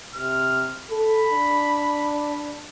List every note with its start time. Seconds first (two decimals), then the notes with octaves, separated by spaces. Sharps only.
0.14 C3 F6
0.90 A4 B5
1.31 D4